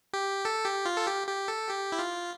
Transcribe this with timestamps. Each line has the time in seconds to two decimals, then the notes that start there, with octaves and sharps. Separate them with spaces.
0.13 G4
0.45 A4
0.65 G4
0.85 F4
0.97 A4
1.07 G4
1.27 G4
1.48 A4
1.69 G4
1.92 E4
1.99 F4